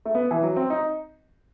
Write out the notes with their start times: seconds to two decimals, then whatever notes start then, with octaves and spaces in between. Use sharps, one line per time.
0.06 A3
0.15 B3
0.31 E3
0.43 F#3
0.56 C4
0.70 D#4